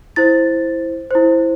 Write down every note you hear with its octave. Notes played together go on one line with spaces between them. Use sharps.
E4 C5 A6
E4 C5